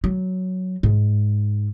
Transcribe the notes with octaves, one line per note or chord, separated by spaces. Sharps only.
F#3
G#2